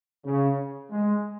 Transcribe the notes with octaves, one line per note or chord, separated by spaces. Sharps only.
C#3
G#3